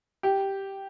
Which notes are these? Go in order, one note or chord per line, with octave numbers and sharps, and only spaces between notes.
G4